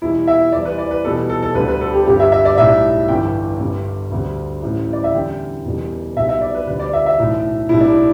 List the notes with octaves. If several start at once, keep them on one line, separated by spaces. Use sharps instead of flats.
E2 B2 G3 E4
E5
E2 E3 G3 D5
B4
D5
B4
E2 B2 G3 A4
A4
A4
D2 D3 G3 B4
B4
A4
G4
G1 G2 G3 G4
E5
E5
D5
B1 A2 G3 E5
G1 G2 E3 G5
G1 G2 D3 G3
D2 D3 G3
A1 A2 G3
D5
E5
E2 D3 G3 G5
E1 E2 B2 G3
B1 B2 G3 E5
E5
D5
B4
D2 D3 G3 B4
D5
E5
E5
B1 A2 E3
B1 A2 G3 E4
D4